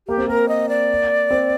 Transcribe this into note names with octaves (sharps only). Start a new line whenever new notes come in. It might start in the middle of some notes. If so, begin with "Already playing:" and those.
A#3 G4
C4
A#3 A#4
D#5
D5
C4